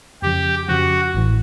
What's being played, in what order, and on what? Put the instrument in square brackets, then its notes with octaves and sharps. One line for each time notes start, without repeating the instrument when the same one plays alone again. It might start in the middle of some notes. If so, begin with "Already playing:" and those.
[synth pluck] F2 C#3 F3 [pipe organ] G4
[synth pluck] F2 C#3 F3 [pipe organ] F#4
[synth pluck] A1 A2 E3